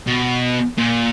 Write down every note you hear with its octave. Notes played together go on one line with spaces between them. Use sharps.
B2
A#2